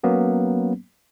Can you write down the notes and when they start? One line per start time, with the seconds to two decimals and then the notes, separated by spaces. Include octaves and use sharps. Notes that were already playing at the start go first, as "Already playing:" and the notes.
0.03 F#3 A#3 B3 C#4